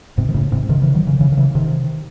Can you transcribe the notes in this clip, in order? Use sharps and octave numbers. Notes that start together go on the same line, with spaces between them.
G#2 C3
D#3
A2 C#3
G#2 C3
C3 D#3
C#3 E3
D#3 F#3
C#3 E3
C#3 E3
D#3
C#3 E3
C3 D#3